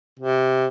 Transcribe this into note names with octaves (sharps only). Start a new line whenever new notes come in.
C3